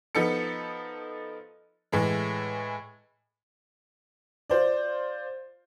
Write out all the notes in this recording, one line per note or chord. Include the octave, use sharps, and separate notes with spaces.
F3 B3 D#4 A4 C#7
A2 E3 G#3
F4 C5 D5